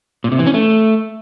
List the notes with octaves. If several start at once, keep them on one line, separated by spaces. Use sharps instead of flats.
A#2
C3
E3
C#4
A3